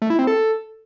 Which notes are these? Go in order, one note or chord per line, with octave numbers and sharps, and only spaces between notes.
A3
E4
C4
A4